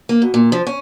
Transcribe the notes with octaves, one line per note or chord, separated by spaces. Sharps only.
A#3
B2
A#2
F3
C#4